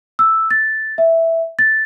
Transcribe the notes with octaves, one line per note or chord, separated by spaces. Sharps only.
E6
A6
E5
A6